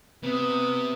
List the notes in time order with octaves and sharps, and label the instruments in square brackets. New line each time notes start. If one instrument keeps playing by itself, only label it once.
[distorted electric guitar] C3 [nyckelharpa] B3 D#6